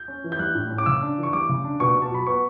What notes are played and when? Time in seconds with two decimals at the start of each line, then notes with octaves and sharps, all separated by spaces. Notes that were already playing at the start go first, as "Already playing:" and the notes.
Already playing: G6
0.08 C#4
0.24 E3
0.32 G6
0.39 G3 F#6
0.55 A2
0.70 C#4
0.78 D6
0.86 C#3 E6
1.02 D4
1.18 E3
1.23 C#6
1.33 G3 D6
1.49 C#3
1.65 D4
1.80 B2 C#6
1.95 B2
2.02 A5
2.11 F#3 B5
2.26 B3 C#6